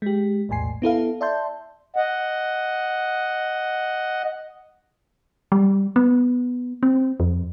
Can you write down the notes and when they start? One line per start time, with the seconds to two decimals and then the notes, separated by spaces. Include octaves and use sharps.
0.02 G#3 G4
0.49 B1 E2 A2 G#5 C7
0.82 B3 E4 A4 F5
1.21 D5 E5 A5 C6 G6
1.96 D#5 F#5
5.52 G3
5.96 B3
6.83 C4
7.20 F2